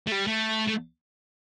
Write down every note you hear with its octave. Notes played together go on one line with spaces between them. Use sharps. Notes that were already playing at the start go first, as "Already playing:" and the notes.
A3
G3
A3
A3